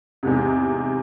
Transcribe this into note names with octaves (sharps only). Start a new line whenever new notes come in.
E2 G#2 C3